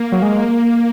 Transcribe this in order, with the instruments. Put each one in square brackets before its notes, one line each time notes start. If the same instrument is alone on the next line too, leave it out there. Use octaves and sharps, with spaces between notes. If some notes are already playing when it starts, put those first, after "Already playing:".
Already playing: [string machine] A#3
[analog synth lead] F#3
G#3